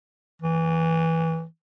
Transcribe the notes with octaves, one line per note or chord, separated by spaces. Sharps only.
E3